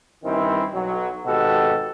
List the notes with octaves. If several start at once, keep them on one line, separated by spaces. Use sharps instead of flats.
G2 D#3 E3 C4 C#4 E4
B1 F#3
G#1 B2 F#4 G4 A4